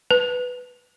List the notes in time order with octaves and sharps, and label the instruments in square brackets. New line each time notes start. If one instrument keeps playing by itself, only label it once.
[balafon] B4